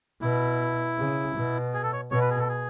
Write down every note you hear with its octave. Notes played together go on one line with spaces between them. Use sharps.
B2 E4
C#3
B2
G#4
A4
C#5
B2 C#5
B4
G#4
A4
G#4